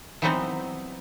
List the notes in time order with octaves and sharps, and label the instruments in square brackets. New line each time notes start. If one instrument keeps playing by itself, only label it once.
[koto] E3 F#3 G3 B3 C4 D#4